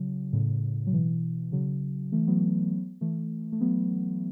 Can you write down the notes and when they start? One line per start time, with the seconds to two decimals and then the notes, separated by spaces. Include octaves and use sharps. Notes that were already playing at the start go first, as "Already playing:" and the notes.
Already playing: C#3 F#3
0.33 A2 C#3
0.87 F#3
0.93 B2 E3
1.52 C#3 F#3
2.12 E3 A3
2.27 F#3 B3
3.01 E3 A3
3.52 A3
3.61 F#3 B3